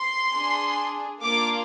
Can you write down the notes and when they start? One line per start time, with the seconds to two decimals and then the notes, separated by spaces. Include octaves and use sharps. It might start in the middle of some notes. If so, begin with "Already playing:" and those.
Already playing: C6
0.33 D4 G#4
1.23 A#3 D4 F4 D6